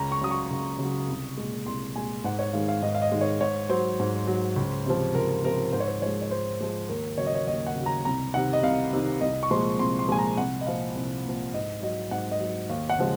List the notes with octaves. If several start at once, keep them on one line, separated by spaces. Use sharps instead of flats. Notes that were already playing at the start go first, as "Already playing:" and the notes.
Already playing: C#2 A#5
C#6
C#3 F#3 D#6
C#6
C#2
C#3 F#3
C2
A#2 G#3
C2 C6
A#2 G#3 G#5
G#2 F#5
C#5
D#3 G#3 F5
F5
G#2 D#5
F5
D#5
D#3 G#3
C#5
G#2 C#5
F#3 C5
G#2
F#3
C#2
C3 F3
C#2 A#4
C3 F3 A#4
G#2 C5
C#5
C5
F3 G#3 C#5
C#5
G#2 C5
F3 G#3
D#2 A#4
C#3 F#3 C#5
D#5
C#5
D#2 D#5
F#5
C#3 F#3
A#5
C2 A#5
C3 D#3 F#5
D#5
C2 F5
C3 D#3
C2 D#5
C#6
A#2 F3 G#3 C6
C2 C6
C6
A#2 F3 G#3 G#5
A#5
C2 F#5
D#5
A#2 F3 F5
C2
A#2 F3
G#2 D#5
F#3 D#5
G#2 F#5
D#5
F#3
D#2 F5
F#5
C#3 F3 G#3